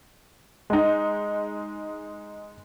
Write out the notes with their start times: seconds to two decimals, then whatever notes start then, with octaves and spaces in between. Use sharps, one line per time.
0.70 G#3 D#4